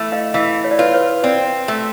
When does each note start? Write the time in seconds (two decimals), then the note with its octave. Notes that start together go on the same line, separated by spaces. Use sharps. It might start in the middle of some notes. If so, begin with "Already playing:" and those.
Already playing: E3 A3
0.12 D#5 F5
0.34 E3 D#5 F5
0.64 C#5
0.71 D5
0.78 F4 B4 C#5
0.94 B4 C#5
1.23 C4 C5 D5
1.68 A3